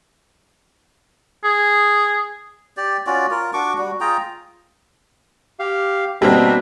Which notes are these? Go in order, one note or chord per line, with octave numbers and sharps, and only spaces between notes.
G#4
G4 D5
C#4 F4 F#4 D5
F4 A#4
D4 F#4 C#6 D6
G3 F#4
F4 G#4 G5 A#5
G4 F5
B2 G3 A#3 C4 D4 E5